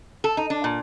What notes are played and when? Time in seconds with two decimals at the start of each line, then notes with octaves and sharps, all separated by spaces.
0.24 A4
0.37 D#4
0.50 D4
0.64 A#2